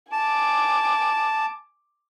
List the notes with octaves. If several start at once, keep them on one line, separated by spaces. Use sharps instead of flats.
G#5 A5 D6